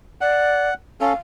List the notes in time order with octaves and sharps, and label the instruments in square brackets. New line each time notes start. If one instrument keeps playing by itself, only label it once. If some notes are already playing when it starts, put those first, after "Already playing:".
[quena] D5 [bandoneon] F#5
[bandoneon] C#4 A4 [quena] F5